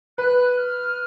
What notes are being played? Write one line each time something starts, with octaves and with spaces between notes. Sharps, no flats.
B4 F#6
F6